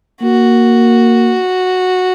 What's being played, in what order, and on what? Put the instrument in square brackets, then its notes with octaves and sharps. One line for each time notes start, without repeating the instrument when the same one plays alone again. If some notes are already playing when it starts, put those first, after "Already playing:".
[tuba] A#3 [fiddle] F#4